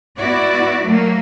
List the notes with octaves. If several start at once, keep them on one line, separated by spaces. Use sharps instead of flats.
B3 E4 F#4 D5
F#3 A3 A#3